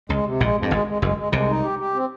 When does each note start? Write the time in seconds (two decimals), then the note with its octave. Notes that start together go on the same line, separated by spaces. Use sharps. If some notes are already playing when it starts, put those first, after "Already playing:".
0.09 C#2 C#3 G#3
0.25 C3
0.40 A#1 A#2 G#3
0.56 F2
0.62 G2
0.71 G#1 G#2 G#3
0.87 G#3
1.02 F#1 F#2 G#3
1.17 G#3
1.32 C2 C3 G#3
1.48 D#4
1.63 G4
1.79 G4
1.94 C4